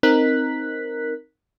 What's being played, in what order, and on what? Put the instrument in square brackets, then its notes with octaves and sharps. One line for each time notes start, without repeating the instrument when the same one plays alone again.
[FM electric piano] C4 D#4 A#4 F#6 B6